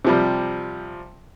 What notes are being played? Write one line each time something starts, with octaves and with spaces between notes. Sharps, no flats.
C3 F3 G3